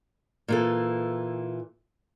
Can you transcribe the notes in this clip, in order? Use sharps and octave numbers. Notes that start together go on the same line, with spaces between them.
A#2 E3 A4